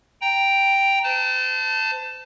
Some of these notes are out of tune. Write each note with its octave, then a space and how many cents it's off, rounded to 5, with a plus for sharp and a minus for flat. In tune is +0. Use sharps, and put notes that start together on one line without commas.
G5 +0 A#5 +0
C5 -40 A5 +5